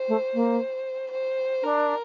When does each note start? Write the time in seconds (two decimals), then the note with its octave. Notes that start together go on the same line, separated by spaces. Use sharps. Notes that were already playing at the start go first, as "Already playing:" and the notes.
Already playing: C5
0.08 A3
0.34 A#3
1.11 C5
1.63 D4 A#4